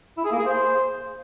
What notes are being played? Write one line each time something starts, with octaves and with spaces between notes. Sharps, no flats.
E4
G#4
A#3
G#4
C5